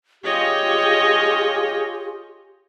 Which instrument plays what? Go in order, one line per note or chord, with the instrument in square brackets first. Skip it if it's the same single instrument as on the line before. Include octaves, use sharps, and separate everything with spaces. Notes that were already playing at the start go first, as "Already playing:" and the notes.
[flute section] F4 G4 G#4 [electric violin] C#5 D#5